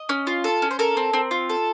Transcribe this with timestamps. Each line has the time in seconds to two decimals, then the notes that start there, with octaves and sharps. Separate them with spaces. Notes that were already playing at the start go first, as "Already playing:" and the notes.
Already playing: D#5
0.09 C#4
0.27 F4
0.44 A4
0.62 C#4
0.71 C5
0.79 A4 A#4
0.97 C4
1.14 C4
1.31 F4
1.49 A4